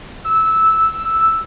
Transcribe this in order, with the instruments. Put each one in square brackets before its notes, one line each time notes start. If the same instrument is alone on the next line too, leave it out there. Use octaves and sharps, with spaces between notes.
[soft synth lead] E6